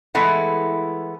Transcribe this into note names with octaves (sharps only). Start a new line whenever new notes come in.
E3 G#3 A3 B3 E4